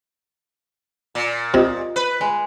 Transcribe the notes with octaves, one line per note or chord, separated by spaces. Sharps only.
A#2
C3 F4 D#5 D#6
B4
G#3